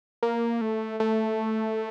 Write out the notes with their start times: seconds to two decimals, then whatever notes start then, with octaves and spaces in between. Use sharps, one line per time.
0.23 A#3
0.61 A3
1.00 A3